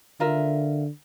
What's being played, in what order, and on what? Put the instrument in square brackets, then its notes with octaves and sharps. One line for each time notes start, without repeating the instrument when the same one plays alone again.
[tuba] D3 [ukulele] F4 A#4 E5